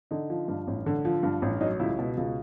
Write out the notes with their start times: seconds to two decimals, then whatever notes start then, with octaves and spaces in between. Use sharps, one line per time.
0.11 D3 D#4
0.30 F3
0.48 G2
0.67 A1
0.86 D3
1.05 F3
1.23 G2
1.42 A1
1.61 F#3 D#4
1.80 C#2 E4
1.99 B2
2.17 C#2